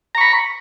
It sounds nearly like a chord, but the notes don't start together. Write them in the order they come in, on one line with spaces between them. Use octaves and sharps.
A#5 C#6 B5